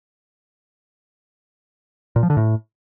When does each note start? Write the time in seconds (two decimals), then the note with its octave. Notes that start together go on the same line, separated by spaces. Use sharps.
2.16 A#2
2.23 F3
2.30 D3
2.37 A2